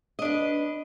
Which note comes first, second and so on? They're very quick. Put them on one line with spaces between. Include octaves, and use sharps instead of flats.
D#5 D4 B4